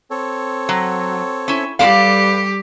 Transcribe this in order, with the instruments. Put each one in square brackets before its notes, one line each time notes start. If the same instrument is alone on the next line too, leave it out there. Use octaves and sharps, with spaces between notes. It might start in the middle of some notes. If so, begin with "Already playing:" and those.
[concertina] C4 A4 C#5
[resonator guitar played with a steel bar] F#3
C#4 E4
[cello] G3 G4 [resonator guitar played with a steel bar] A4 D5 F5 [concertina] B4